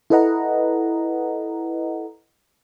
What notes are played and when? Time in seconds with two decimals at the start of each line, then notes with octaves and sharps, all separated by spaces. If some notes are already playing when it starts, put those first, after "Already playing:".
0.10 E4 A4 B4 D#5 F#5 A#5